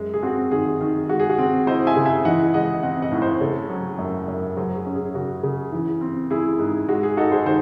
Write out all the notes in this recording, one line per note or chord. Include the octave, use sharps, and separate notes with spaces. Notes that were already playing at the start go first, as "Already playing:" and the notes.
Already playing: F#2 G#3
G#4
C4 F#4
D#3 G#4
D#3
G#3 F#4
G#4
F#4
C4
E4 C5 D#5
E5 G#5
C#3
E5 G#5
E3 D#5 F#5
G#3 D#5 F#5
C4 D#5 F#5
D#5 F#5
A2
C5 D#5
C#3 A4 C#5
F#3
F#2
F#2
F#3 G#4 C5
G#4
C#4
G#4
C#3 F#4
C#3
E3
C4
E4 G#4
G#2
G#3 F#4
G#4
D#4 F#4 A4
G#4 C5
D#3 C5